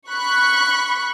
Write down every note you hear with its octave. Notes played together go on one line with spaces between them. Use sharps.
B5 C#6 F#6